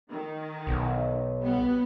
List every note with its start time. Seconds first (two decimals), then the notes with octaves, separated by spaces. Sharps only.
0.10 D#3
0.67 B1
1.39 G3 B3